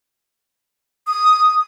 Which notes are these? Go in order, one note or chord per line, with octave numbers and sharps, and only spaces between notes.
D#6